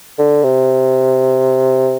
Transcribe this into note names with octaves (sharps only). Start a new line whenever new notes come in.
D3
C3